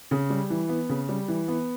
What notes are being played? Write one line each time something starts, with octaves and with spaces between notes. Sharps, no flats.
C#3
G3
E3
B3
C#3
G3
E3
B3